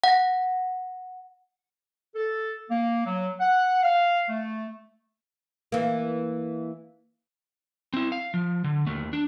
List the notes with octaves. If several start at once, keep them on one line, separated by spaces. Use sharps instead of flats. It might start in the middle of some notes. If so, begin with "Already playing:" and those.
F#5 A#6
A4
A#3
F#3
F#5
F5
A3
E3 A#3
C4 E4
F5
F3
D3
D#2 A3
D4